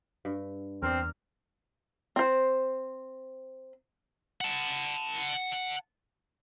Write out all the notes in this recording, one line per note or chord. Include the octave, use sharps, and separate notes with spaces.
G2
E2 C4 A#4 D5 F6
C4 C5
F#5 A5